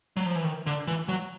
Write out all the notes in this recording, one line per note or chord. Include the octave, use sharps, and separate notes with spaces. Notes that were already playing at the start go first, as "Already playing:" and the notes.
F#3
F3
E3
D#3
D3
E3
F#3